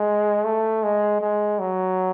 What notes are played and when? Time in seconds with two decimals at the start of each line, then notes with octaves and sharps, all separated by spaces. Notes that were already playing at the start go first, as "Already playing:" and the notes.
Already playing: G#3
0.45 A3
0.83 G#3
1.21 G#3
1.59 F#3